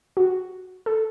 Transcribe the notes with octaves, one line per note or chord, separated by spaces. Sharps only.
F#4
A4